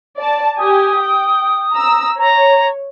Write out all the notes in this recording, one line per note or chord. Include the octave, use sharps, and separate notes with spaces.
D5 A5
G4 G#5 D#6
G5
A#5 E6
C#5 A#5